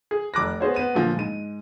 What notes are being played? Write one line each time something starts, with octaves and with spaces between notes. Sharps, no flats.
G#4
F1 D6 F#6 A#6
B3 G#4 C5 C#5
B3 D#7
A#2 D3 F3
G#2 D#7